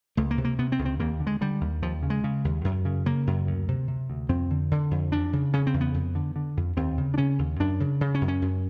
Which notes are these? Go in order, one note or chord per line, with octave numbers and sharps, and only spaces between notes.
C#2 A3
A#3
C3
A#3
C3 B3
C4
C#2
C4
D#2 A#3
D3
G#3
D3 G3
D#2
D#2 F3
C#3
G#3
C#3
D#2
F#2
C#3
C#3 A#3
F#2
D2
C3
C3
D2
F2 C4
D3
D3
F2
E2 D4
C#3
C#3 C#4
C4
E2
B3
F2
D3
D3
F2
D#2 C4
C#3
D4
C#3 C#4
D#2
F#2 D4
C#3
C#3
C#4
F#2
C#4
F#2